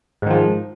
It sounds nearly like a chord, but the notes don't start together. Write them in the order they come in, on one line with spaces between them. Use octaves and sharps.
G#2 D#3 F3